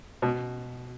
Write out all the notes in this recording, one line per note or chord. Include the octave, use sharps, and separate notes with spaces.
B2